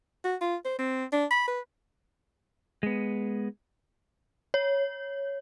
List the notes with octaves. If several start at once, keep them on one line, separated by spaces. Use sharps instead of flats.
F#4
F4
C5
C4
D4
B5
B4
G#3 B3
C#5